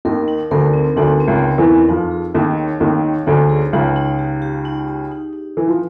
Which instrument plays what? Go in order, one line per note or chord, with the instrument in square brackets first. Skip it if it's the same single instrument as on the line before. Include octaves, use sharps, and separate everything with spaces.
[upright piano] D#2 D#3 [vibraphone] A#4
[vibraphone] D#4
[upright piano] D2 D3 [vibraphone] A#4
[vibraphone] C4
[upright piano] D2 D3 [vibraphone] D#4
[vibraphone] C4
[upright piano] C#2 C#3
[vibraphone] A#4
[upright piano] E2 E3
[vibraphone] F#4
[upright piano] F2 F3 [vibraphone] D#4
[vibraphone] G#4
[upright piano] D#2 D#3 [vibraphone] A#3
[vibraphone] C#5
[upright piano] D#2 D#3 [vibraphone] C#5
[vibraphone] D#4
[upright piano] D2 D3 [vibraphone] D#4
[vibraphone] G#4
[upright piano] C#2 C#3 [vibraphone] D#4
[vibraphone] D#4
G4
G4
D#4
G4
D#4
D#4
[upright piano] E3 [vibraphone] D4
[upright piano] F3